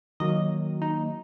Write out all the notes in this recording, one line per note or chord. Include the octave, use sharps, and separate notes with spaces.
D#3 F#3 A#3 D#5
D#4